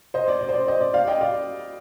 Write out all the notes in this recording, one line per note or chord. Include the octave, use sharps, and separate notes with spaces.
C5 D#5
D5
D5
C5
D5
C5 D#5
D5
D5 F5
D#5 G5
D5 F5